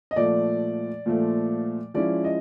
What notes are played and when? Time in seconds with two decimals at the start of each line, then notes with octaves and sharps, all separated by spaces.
0.11 D#5
0.16 A#2 F3 A3 D5
1.06 A#2 F3 A3
1.94 F3 G#3 C#4 E4 D5
2.24 D#5